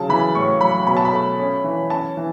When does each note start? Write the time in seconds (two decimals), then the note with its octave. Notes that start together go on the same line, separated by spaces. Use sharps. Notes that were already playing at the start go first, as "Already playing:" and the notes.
Already playing: C#3 F#3 A5
0.09 E3 B5
0.35 A2 C#6
0.61 F#3 B5
0.87 B2 B5
0.97 A5
1.05 B5
1.13 A3
1.39 C#4
1.64 E3
1.90 C#4 A5
2.17 E3